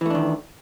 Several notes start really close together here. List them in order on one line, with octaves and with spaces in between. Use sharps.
E3 A3 D4 D#3